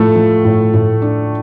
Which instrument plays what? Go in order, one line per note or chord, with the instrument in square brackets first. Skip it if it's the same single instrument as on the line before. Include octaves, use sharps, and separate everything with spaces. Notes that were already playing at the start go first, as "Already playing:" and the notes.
Already playing: [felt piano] A2 F3 [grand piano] A3 A4
[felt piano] F3
A2
A2
D4